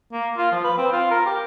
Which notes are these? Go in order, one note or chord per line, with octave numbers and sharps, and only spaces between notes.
A#3
F4
F3
B4
C4
F4
A#4
G4